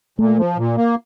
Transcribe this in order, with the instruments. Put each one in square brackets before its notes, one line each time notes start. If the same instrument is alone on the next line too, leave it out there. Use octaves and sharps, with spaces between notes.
[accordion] A#2 [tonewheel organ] A3
[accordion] F3
A#2
A#3